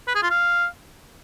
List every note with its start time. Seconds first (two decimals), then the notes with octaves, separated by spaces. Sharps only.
0.08 B4
0.15 G#4
0.23 F4
0.31 F5